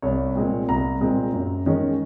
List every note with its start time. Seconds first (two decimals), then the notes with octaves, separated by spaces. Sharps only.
0.02 C2 C#5
0.35 A#2 G#3 C4
0.69 C2 A#5
1.01 A#2 G#3 C4
1.34 F#2
1.66 D#3 G#3 C#4